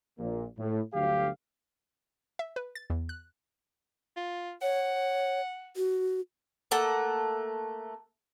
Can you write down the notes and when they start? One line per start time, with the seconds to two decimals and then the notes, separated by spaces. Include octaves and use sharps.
0.19 A#1 A#2
0.58 A2
0.94 G1 D2 D3 F#3 G4 F5
2.39 E5
2.56 B4
2.75 A6
2.90 E2
3.09 F#6
4.17 F4
4.62 C#5 F#5
5.76 F#4
6.71 A3 A#3 A4 F#5